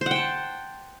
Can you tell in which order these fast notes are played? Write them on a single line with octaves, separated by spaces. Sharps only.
C5 F#5 G5 A5